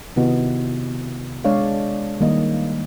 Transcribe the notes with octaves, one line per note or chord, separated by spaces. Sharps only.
C3 D#3 B3 E4 F#4 D#5
G#3 D4 C#5 D5 F5
D#3 G3 A#3 D#5